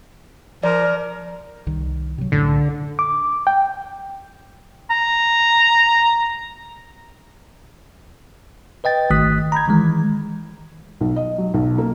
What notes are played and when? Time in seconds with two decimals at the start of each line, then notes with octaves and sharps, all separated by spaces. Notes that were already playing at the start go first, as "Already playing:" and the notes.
0.63 F3 A#4 D5
1.66 C2 D#3
2.18 C3 F#3
2.32 C2 F#2 A2 D3
2.99 D6
3.47 G5
4.91 A#5
8.84 B4 D#5 G5 A6
9.10 G#1 D#3 A3 D#6 F#6 B6
9.52 A#5 B5 G6 G#6
9.68 D#3 E3 G#3
11.01 B1
11.16 D#5
11.38 F#3
11.54 B1
11.78 A#3